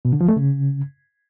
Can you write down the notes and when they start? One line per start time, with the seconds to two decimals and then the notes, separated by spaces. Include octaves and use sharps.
0.05 B2
0.13 D3
0.21 F3
0.28 A3
0.36 C#3